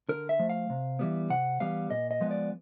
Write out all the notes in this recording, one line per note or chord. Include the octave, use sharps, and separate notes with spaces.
D3 A#4
E5
F3 A3
F5
C3
E3 G3 B3
C3 F#5
E3 G3 B3 F5
A#2 D#5
D#5
F3 G#3 B3
D5